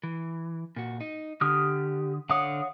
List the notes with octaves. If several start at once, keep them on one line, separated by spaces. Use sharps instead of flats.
E3
A#2 F#4
D#4
D3 G4 D#6 F6
D3 C#5 F5 F#5 D#6